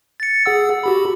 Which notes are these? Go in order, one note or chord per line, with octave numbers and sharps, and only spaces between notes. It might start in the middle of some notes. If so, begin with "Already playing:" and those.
A6 C#7
G#4 F#5 E6
F#4 G4 B5